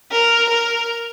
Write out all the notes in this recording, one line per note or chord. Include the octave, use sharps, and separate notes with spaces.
A#4
A#4